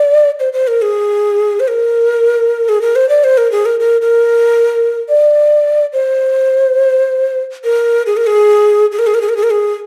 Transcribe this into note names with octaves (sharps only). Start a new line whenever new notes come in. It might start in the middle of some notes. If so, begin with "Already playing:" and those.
Already playing: D5
C5
C5
A#4
G#4
C5
A#4
G#4
A#4
C5
D5
C5
A#4
G#4
A#4
A#4
A#4
D5
C5
A#4
G#4
A#4
G#4
G#4
A#4
G#4
A#4
G#4
A#4
G#4
A#4
G#4